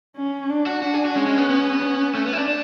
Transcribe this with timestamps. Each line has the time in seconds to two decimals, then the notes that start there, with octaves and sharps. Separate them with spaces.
0.17 C#4
0.50 D4
0.67 F#4
0.82 D4 F#4
0.94 G#4
1.05 F#4
1.15 G#3 C#4
1.26 G#3
1.38 B3
1.49 B3
1.82 C#4
2.15 A3
2.25 B3
2.33 E4
2.37 D4
2.48 D4